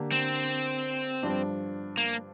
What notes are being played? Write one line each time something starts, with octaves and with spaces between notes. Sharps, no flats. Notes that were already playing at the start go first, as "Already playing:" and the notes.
Already playing: D3 A#3 D4 G4
C4
G2 F3 D4
A#3